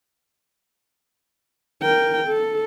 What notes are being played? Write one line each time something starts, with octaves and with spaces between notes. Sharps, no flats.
A#4 G5
A4